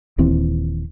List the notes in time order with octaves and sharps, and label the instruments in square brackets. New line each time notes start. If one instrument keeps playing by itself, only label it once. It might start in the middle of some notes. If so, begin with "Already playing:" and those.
[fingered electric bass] D#1 D#2 E3 C4